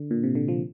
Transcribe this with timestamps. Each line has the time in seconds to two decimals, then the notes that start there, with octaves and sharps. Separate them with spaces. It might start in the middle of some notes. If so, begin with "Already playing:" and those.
Already playing: D3
0.11 A#2
0.23 C3
0.35 D3
0.48 F3